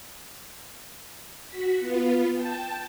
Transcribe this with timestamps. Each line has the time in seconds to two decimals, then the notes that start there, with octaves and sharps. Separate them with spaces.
1.46 F#4 B6
1.79 B3 F4 B4
2.33 G5 A5